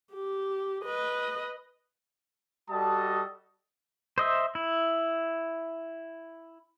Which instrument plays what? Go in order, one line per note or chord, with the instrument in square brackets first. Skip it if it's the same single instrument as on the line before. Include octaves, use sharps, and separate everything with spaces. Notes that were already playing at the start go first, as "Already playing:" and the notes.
[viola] G4
B4 D#5
[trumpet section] G3 F#4 A4 D#5 A5 D#6
[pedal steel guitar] C5 D#5 E5
E4